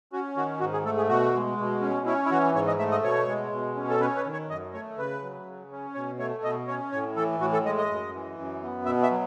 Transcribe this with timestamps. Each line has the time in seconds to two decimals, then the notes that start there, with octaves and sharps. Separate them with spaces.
0.13 C#4 F#4
0.37 D#3 F#4
0.60 G#2 F#4
0.73 G#4
0.85 A3 A4
0.97 G#4
1.09 B2 F#4
1.34 G#3
1.58 B2
1.82 C#4
2.06 C#4 E4
2.25 E4
2.31 E3 F#4
2.54 G#2 C#5
2.67 D#5
2.79 A3 E5
2.91 D#5
3.03 B2 C#5
3.28 G#3
3.52 B2
3.76 C#4
3.90 A4
4.00 C#4 B4
4.17 B4
4.26 D#3
4.33 C#5
4.50 F#2 D#5
4.73 A3 C#5
4.98 C#3 B4
5.22 F#3
5.46 C#3
5.71 C#4
5.94 B2 C#5
6.19 A3 C#5
6.43 B2 D#5
6.68 C#4 C#5
6.91 A2 C#5
7.16 E3 A4
7.40 A2 F#4
7.53 A4
7.66 G#3 D#5
7.78 D#5
7.89 F#2
8.14 E3
8.38 F#2
8.63 B3
8.86 B2 E5
9.03 E5
9.11 F#3